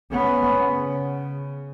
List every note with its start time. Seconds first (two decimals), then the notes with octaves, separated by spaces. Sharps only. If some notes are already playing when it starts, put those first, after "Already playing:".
0.12 B3 C#4
0.65 C#3